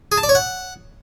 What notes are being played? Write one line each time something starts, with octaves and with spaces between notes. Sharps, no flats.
G#4
A5
D5
C#5
F#5